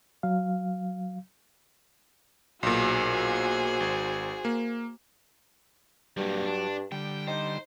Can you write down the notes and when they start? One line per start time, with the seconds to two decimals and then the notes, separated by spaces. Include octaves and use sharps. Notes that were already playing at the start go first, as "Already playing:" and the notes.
0.23 F#3 F5
2.63 B1 A#2 F#4 G#4 C5
3.80 G#1
4.45 A#3
6.17 G2 F#3 G3 A#3
6.45 D4
6.92 D3 G3 G5
7.28 D#4 C5